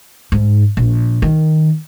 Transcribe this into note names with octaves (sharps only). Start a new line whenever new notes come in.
G#2
A#1
D#3